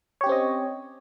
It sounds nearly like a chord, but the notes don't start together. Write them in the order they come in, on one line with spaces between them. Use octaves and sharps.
C#5 G4 C#4 C4 D#5